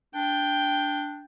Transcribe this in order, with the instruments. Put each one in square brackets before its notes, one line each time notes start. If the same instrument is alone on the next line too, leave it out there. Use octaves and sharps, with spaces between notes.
[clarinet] D4 [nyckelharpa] G5